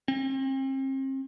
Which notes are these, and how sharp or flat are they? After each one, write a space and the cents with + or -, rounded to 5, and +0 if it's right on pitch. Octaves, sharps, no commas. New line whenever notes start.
C4 +40